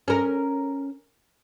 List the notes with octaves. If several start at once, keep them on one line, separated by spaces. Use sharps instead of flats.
C#4 A#4